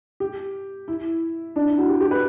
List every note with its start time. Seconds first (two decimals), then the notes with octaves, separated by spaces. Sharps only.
0.20 G4
0.88 E4
1.56 D4
1.66 E4
1.78 F#4
1.89 G4
2.01 G4
2.11 B4